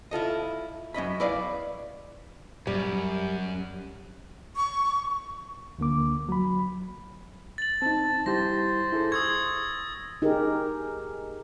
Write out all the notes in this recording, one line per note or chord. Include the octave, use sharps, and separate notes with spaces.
E4 F4 A4 D#5
F#2 C#4 D#5 B5
E4 B4 D5 D#5 F5
F#2 G3
C#6
D2 D3 A#3 D6
F#3 B5
A6 F#7
C4 D#4 A5
G3 E4 G4 C5 A#6
E4 G#4 A4
C#6 D#6 E6 G#6
D#4 G4 G#4 A#4